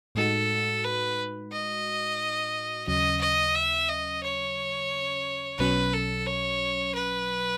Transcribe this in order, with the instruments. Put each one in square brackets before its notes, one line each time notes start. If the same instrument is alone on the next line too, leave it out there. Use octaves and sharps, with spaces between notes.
[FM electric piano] A2 G#3 D#4 F#4 [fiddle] A4
[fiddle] B4
D#5
[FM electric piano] D#2 C#3 F#3 C#4 [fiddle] D#5
[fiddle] D#5
E5
D#5
C#5
[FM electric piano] B1 B2 F#3 C#4 [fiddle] B4
[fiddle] A4
C#5
B4